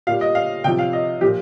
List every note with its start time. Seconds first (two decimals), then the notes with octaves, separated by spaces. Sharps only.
0.07 A#2 F5
0.11 G3
0.21 D#5
0.35 F5
0.64 C3 F3 G5
0.79 F5
0.93 D#5
1.21 A#2 F3 G4